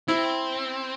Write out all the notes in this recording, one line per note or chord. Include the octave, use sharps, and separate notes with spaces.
C4 E4